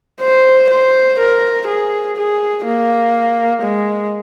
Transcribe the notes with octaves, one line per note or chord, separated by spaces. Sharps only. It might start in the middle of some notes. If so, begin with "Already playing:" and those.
C5
C5
A#4
G#4
G#4
A#3
G#3